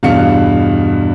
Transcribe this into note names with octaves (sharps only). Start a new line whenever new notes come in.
E2 G2 B2 F5 C#7